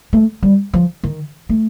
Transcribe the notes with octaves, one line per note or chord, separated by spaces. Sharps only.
A3
G3
F3
D#3
A3